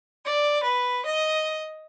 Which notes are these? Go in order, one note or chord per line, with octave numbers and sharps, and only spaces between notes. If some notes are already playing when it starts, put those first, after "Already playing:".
D5
B4
D#5